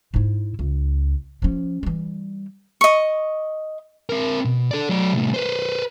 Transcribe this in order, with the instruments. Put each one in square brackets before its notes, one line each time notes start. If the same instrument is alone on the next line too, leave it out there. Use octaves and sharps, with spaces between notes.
[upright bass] G#2 E4
C#2
F3 C#4
E3 G3
[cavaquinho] D#5 C#6
[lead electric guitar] C4 A#4
B2
A4 D5
F#3 D5
C2 A2
B4 C5